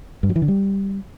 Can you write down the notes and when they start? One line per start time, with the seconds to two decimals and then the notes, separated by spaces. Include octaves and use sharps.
0.23 G2
0.29 F#3
0.36 E3
0.42 D3
0.48 G3